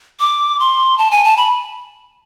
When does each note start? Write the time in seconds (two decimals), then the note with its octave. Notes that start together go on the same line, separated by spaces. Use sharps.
0.20 D6
0.60 C6
0.98 A5
1.11 G#5
1.24 A5
1.37 B5